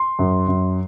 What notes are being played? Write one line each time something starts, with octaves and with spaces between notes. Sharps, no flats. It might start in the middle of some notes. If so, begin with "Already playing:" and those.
Already playing: C6
F#2
F#2